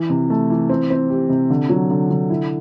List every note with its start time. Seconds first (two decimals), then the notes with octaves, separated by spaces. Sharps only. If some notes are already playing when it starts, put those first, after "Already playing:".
Already playing: E3
0.10 C3
0.30 A3
0.50 E3
0.69 C4
0.90 C4
1.10 G4
1.29 C3
1.50 D3
1.69 F#3
1.90 D3
2.10 D3
2.30 E4